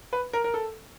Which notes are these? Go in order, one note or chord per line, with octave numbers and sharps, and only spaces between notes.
B4
A#4
A#4
A4